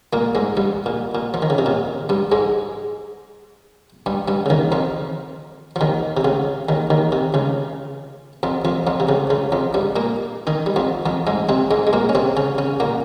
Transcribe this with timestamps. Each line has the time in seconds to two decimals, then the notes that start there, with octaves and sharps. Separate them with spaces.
0.13 A#2 A#3
0.35 G#2 G#3
0.57 G2 G3
0.86 A#2
1.15 A#2
1.34 F3
1.42 D#3
1.50 C#3
1.58 C3
1.66 A#2
2.09 G2 G3
2.32 G#2 G#3
4.06 G2 G3
4.28 G2 G3
4.46 C#3
4.50 D#2 D#3
4.72 F2 F3
5.76 F3
5.81 D#2 D#3
6.17 C3
6.25 C#2 C#3
6.69 D#2 D#3
6.90 D#2 D#3
7.12 C3
7.34 C#2 C#3
8.43 F2 F3
8.65 F2 F3
8.87 F2 F3
9.00 C3
9.09 C#2 C#3
9.30 C#2 C#3
9.52 F2 F3
9.74 G2 G3
9.96 A#2 A#3
10.47 D#3 D#4
10.66 G3
10.76 F2 F3
11.06 F2 F3
11.27 G#2 G#3
11.49 C3 C4
11.71 G#2 G#3
11.87 G#3
11.93 A#2 A#3
12.09 C#4
12.15 C3 C4
12.37 C#3 C#4
12.58 C#3 C#4
12.80 A#2 A#3